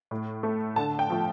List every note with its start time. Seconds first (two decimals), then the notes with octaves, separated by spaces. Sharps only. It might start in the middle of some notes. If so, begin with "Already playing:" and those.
0.11 A2
0.43 A3
0.76 D3 A5
0.99 G5
1.10 F3 A3